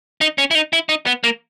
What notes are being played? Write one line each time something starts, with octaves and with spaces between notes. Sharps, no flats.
D#4
C#4
E4
D#4
E4
D#4
B3
A#3